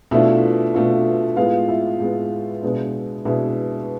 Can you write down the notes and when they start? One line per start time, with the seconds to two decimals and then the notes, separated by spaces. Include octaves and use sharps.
0.11 B2 A3 D4 E4 F4 E5
0.74 B2 A3 D4 F4
1.36 A2 G#3 B3 F4 F5
1.68 E4 E5
2.00 A2 G#3 B3
2.63 B2 G#3 B3 D4
3.25 B2 G#3 B3 D4 E4 E5